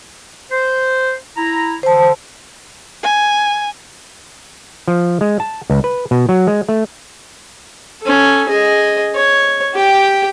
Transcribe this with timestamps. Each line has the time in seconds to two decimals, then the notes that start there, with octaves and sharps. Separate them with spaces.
0.50 C5
1.36 E4 A#5
1.83 D3 C5 A5
3.03 G#5
4.88 F3
5.21 G#3
5.40 A5
5.70 C#2
5.84 B4
6.11 B2
6.29 F#3
6.47 G#3
6.69 A3
8.01 C#4 A4
8.48 G#4 D#5
9.15 C#5
9.74 G4 G5